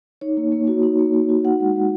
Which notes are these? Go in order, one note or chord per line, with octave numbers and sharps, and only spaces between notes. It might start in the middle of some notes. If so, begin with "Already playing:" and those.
D#4 C#5
A#3
A#3
F#4
D#4
A#3
A#3
F#4
D#4 F#5
G#3
G#3